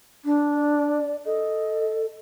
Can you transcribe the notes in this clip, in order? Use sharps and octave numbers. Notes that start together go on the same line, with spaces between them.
D4
D5
A4 D#5